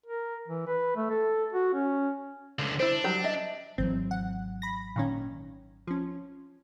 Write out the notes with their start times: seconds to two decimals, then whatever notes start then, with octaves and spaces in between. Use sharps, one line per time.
0.06 A#4
0.48 E3
0.67 B4
0.96 A3
1.10 A4
1.53 F#4
1.74 C#4
2.59 C#2 D3
2.80 D4 E4 C5
3.04 F#3 G3 G4
3.24 D#5 E5
3.78 G#1 E3 F#3 C4
4.11 F#5
4.62 B5 A#6
4.96 A#2 D#3 C#4
5.87 F3 C#4